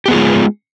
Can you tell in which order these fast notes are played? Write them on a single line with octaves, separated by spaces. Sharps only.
G4 B3 G#4 F4 G#3